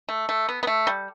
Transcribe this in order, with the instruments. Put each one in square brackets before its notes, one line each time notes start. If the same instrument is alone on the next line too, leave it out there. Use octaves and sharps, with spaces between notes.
[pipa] A3
A3
B3
B3
A3
G3